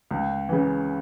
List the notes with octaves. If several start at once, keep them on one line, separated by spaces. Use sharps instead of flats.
C#2
C#3 E3